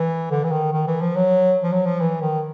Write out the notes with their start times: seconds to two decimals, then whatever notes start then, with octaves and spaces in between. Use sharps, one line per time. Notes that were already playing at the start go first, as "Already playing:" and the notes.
Already playing: E3
0.31 D3
0.44 E3
0.52 D#3
0.73 D#3
0.87 E3
1.01 F3
1.16 F#3
1.63 F3
1.72 F#3
1.86 F3
2.00 E3
2.21 D#3